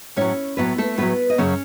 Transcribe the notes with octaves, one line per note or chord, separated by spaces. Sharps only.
A2 F#3 C#4 C#5
A2 F#3 B3 B4
A3 A4
A2 F#3 B3 B4
D#5
F#2 C#3 F#3 C#4 C#5